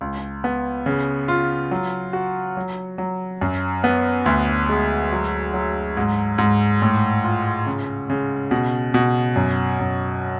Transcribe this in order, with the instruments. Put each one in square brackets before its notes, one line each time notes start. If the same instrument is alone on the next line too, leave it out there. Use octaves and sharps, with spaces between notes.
[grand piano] C#2
B3
C#3
F4
F#3
F#4
F#3
F#3
F#2
B3
D2
G#3
F#3
F#3
G#2
G#2
A2
F4
C#3
C#3
B2
B2
F#2
F#2